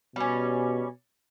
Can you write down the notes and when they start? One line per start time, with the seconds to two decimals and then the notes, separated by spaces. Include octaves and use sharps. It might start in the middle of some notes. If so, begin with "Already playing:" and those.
0.16 B2 G3 C#4